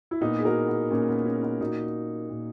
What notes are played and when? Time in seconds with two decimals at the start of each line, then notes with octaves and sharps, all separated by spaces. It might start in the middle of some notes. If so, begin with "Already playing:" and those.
0.11 E4
0.21 A#2 B3 D#4
0.39 G#4
0.45 F#4 A#4
0.68 B3
0.91 A#2 C#4
1.08 B3
1.25 C#4
1.43 B3 D#4
1.60 A#2 D#4 F#4
2.30 A#2